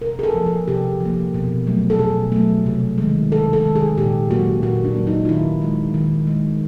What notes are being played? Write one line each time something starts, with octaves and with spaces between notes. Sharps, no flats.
C3 A#4
G#4
A4
F3 A#3
G#4
C3 G4
F3 A#3
B2
F#3 A3
A4
B2 G#4
F#3 A3
C3
D#3 G#3
C3 A4
A4
D#3 G#3
G#4
A#2 G4
F#3 A#3 F#4
A#2 F#4
D4
F#3 A#3
D#4
F4
D#3 E4
G#3
D#3
G#3